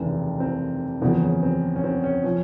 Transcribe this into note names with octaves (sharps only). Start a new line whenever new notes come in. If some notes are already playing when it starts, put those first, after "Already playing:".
Already playing: F1 D#2 C#3 E3
C4
F#1 E2 C#3 F3 C4
C#4
C4
C#4
C4
C#4
F3 C#4